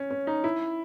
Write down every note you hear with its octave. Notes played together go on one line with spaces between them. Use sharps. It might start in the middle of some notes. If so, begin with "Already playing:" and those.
Already playing: C#4
C#4
D#4
E4